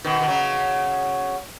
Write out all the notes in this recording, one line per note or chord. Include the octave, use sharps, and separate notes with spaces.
B2 D#3
D#3
C#3 F#3